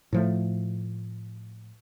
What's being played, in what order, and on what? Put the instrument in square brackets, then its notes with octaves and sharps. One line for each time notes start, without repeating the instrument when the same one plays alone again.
[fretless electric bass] A2 F3 A3